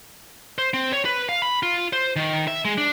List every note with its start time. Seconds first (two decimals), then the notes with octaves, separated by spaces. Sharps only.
0.58 C5
0.74 C4
0.93 C#5
1.05 B4
1.29 F5
1.42 B5
1.63 F4
1.93 C5
2.16 D#3
2.48 E5
2.65 G#3
2.78 D4